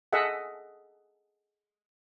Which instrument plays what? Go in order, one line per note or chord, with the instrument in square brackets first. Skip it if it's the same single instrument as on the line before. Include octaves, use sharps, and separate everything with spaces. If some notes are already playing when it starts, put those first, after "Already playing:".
[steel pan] G#4 A4 D#5 E5 F#5